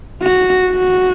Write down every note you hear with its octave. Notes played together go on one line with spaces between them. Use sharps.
F#4
F#4